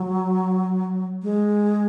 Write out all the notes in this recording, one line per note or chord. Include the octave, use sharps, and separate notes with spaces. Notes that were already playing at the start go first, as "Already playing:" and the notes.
Already playing: F#3
G#3